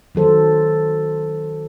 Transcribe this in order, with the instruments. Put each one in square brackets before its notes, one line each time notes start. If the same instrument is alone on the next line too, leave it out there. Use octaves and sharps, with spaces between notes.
[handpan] D#3 F#3 A4 C5